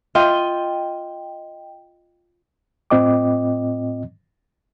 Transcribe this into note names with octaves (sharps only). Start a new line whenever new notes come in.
F4 D#5 G5
A2 C4 F4 D#5 G5 D6